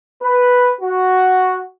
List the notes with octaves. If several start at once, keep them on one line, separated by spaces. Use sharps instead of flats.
B4
F#4